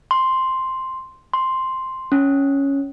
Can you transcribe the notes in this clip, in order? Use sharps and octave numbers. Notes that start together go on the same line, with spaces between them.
C6
C6
C#4